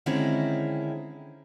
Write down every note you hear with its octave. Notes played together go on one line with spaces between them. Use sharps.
D3 D#3 G#3 C4 C#4 E4